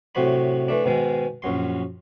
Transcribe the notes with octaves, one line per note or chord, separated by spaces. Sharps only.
A2 C3 F#3 F#4 C5 B5
E3 A3 D4
G#2 B2 D#3 G#3
A#1 F#2 F#3 C6